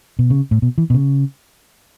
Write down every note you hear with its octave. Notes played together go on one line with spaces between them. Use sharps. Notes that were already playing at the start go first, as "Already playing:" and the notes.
B2
C#3
A2
B2
E3
B2
C#3